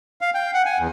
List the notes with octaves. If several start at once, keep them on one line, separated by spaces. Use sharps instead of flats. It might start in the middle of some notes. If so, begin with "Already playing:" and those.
F5
G5
F#5
G#5
E2